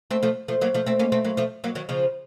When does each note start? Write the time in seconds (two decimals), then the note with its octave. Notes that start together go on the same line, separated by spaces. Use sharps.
0.11 A3 C4
0.23 F3 A3
0.48 F3 A3
0.61 F#3 A#3
0.74 F3 A3
0.86 A3 C4
0.99 A#3 C#4
1.12 A3 C4
1.25 F#3 A#3
1.37 F3 A3
1.64 F#3 A#3
1.75 D#3 F#3
1.89 C#3 F3